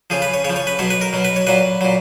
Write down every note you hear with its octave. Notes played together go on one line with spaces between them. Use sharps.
C#3 F3 G#4
B4
C#5
C#3 C#5
F3
C#5
B4
B2 F#3 C#5
B4
A#4
B2 F#3
B4
C#5
A#2 F#3 B4
A#2 F#3